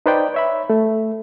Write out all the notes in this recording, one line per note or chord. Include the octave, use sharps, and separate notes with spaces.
D#4 B4 C5 D5 G5
C#5 E5 B5
A3